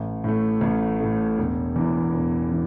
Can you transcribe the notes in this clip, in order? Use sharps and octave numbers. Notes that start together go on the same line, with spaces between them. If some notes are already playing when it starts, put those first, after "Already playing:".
Already playing: A1
A2 A3
A1
A2 A3
E1
E2 E3
E1
E3